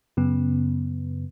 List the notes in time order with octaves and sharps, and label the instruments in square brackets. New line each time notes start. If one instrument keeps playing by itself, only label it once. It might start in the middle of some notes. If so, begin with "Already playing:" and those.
[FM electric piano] F#2 C#3 B3